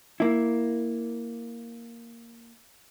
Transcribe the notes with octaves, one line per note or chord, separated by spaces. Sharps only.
A#3 E4